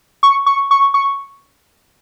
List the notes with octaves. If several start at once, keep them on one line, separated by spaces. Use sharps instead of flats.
C#6
C#6
C#6
C#6